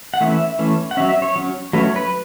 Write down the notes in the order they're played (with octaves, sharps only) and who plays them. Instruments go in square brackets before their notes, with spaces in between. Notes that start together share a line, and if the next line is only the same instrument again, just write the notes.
[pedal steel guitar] F#5
E3 A3 C#4 E5
E3 A3 C#4
F#5
F#3 C#4 E5
E5
C#5
F#3 C#4
F#3 A3 C#4 B4
C#5
B4